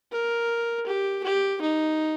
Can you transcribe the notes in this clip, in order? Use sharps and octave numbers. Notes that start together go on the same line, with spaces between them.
A#4
G4
G4
D#4